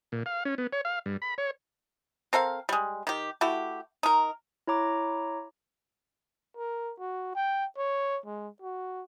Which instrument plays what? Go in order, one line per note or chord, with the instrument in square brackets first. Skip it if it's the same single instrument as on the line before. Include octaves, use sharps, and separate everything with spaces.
[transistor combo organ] A#2
F5
C#4
B3
C#5
F5
G2
B5
C#5
[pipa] C4 A4 A#4 F5
G3 G#3
D#3 G4
A3 E4 F#4 G4
D#4 A#4
[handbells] E4 C#5 A#5 D6
[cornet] A#4
F#4
G5
C#5
G#3
F#4